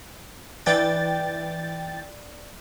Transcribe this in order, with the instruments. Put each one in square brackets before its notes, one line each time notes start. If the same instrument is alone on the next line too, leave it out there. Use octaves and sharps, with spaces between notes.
[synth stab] E3 G5 A6 [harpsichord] D4